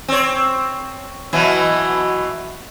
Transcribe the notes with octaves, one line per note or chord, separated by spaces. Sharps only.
C4 C#5
B2 E3 F#3